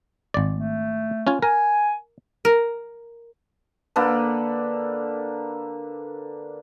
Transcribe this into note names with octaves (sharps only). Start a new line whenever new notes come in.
G#1 D5
A3
C#4 F4 G#5
A#4 G#5
A#4
D3 A#3 A4 B4